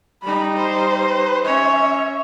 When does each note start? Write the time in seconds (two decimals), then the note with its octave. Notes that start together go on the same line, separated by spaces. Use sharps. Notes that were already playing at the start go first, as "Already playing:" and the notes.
0.22 G3 D#4 B5
0.56 C5
1.45 C#4 C#5 E5